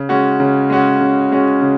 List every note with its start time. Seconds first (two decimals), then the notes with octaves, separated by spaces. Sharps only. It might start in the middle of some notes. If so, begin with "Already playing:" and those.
Already playing: C#3
0.09 G#3 C#4 F#4
0.40 C#3
0.70 G#3 C#4 F#4
1.01 C#3
1.32 G#3 C#4 F#4
1.62 C#3